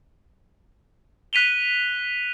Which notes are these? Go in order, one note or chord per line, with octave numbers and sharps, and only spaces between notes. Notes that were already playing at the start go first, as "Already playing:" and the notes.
F#6 B6 D#7 F7 G7